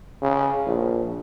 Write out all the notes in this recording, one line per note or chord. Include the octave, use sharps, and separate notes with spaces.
C#3
A#1